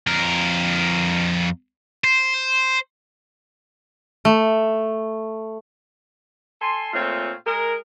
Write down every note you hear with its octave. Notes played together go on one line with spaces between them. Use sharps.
F2 A#4
C5
A3
A4 G#5 C6
A#2 A3 C4 F4 C#5
G#3 G#4 A#4